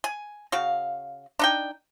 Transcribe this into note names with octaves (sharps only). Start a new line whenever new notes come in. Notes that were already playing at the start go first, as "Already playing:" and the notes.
G#5
C#3 F#4 F5
D4 D#4 G5